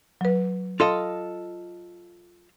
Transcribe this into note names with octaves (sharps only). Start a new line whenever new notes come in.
F#3 B4
F4 A4 D#5 C6